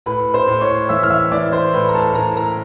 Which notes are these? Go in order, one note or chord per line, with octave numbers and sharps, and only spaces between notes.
A2 B4 B5
C5 C6
A2
C#5 C#6
E3 E5 E6
F6
E5 E6
E3 D5 D6
C5 C6
A2 B4 B5
A#5
A4 A5
A2 A#4 A#5
A#4 A#5